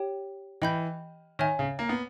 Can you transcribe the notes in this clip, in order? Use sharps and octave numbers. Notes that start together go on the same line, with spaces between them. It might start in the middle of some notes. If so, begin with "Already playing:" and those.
Already playing: G4 C#5 G5
E3 D#5 G5 B5 G6
D#3 C#5 E5 G#5
C#3
A#3
B3